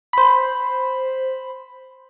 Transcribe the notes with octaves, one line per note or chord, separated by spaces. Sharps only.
C5 B5